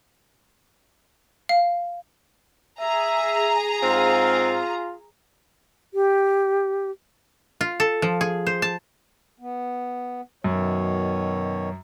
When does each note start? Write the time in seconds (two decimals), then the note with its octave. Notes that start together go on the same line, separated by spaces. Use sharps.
1.49 F5
2.80 G#4 E5 A#5
3.82 G#2 C4 F4 F5
5.94 G4
7.61 F4
7.80 A4
8.02 F3
8.21 G#4
8.47 C5
8.62 A5
9.39 B3
10.44 F#2 B2 D#3 C#5